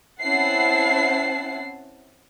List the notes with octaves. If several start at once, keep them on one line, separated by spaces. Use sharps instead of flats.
C4 C#4 E4 F#5 A5 C7